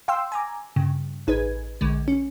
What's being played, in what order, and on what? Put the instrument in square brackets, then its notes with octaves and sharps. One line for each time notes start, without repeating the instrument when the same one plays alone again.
[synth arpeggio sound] F5 G5 C6 E6
G#5 A#5 D6
G2 C#3
A1 D#4 G#4 B4 G#6
A#1 D3 G#3
C#4